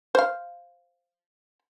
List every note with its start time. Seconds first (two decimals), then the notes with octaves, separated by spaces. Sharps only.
0.15 C5 F5